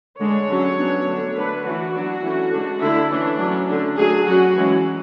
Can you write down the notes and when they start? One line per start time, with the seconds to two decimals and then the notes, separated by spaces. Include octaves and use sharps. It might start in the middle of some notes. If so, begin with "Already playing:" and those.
0.19 D3 G#3 D4 C#5
0.49 D3 F#3 C#4
0.77 F#3 B3 D4
1.06 D3 A3 D4
1.36 D3 A3 D4 B4
1.65 E3 A3 D4 F#4
1.95 F#3 B3 D4
2.23 E3 A3 C#4
2.52 D3 G#3 D4
2.82 D3 A3 D4 E4
3.10 E3 A3 C#4 D4
3.39 F#3
3.44 C#4
3.69 D3 A3 D4
3.97 F#3 A3 D4 G#4
4.27 F#3 C#4 F#4
4.57 E3 G#3 C#4